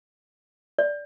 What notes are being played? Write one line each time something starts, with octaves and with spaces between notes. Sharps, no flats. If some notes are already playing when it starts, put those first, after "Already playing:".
D5